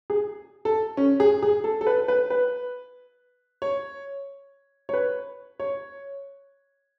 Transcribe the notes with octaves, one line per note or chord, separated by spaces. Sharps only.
G#4
A4
C#4
G#4
G#4
A4
A4
B4
B4
B4
C#5
C#5
B4
C#5